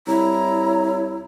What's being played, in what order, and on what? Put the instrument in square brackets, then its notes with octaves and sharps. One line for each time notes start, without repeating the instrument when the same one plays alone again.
[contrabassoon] C2 [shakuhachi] E4 [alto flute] C#5 [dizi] A#5